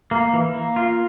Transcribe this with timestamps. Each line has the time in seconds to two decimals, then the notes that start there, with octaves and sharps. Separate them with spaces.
0.11 A#3
0.33 E3
0.54 A#3
0.76 F4